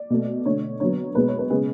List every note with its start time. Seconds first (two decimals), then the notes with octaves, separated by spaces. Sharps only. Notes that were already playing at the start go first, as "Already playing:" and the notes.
Already playing: D5
0.10 B2 A3
0.45 D3 A3 C#5
0.80 D3 F#3 B3 C#5
1.15 B2 G#3 B3 B4
1.28 C#5
1.39 B4
1.50 C#3 G#3 B3 G#4